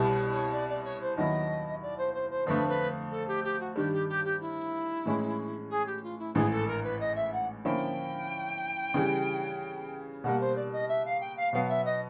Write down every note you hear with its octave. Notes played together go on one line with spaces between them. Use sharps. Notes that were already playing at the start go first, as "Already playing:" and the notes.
Already playing: C2 B2 G3 B3 E4
C#5
C#5
D5
D5
C#5
C5
D#2 D#3 F#3 B3 E4 D#5
D5
C5
C5
C5
F2 D3 F3 A3 B4
B4
A4
G4
G4
F#4
G2 D#3 G3 G4
G4
G4
G4
E4
A2 E3 G#3 C#4
G#4
G4
F4
E4
A1 G#2 E3 G#4
A4
A#4
B4
D#5
E5
F#5
D3 F3 A#3 C#4 E4 G5
C#3 E3 G3
B2 G3 A#3 F#5
C5
D5
D#5
E5
F5
G5
F5
B2 F#3 B3 F5
F5
E5
D#5